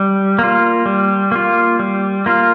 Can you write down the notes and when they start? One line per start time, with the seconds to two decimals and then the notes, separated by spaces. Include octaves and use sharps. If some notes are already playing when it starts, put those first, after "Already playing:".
Already playing: G3
0.39 A#3 F4
0.86 G3
1.32 A#3 F4
1.79 G3
2.26 A#3 F4